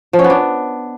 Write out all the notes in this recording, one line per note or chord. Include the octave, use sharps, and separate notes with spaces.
F3
C#4
B3
D4